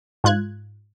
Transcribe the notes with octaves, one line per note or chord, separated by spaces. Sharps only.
G#2 F4 F#6 G#6